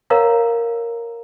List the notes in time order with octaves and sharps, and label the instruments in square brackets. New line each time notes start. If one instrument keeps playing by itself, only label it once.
[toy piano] A#4 C#5 F5 F#5 A#5